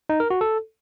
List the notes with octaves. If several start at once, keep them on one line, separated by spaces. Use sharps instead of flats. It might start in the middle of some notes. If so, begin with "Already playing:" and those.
D#4
A#4
F#4
A4